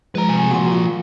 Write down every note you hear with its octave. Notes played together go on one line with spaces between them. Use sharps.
F3 G#3 B4 A#5
C3 G#5
F3 A#3 F#4 C6
F4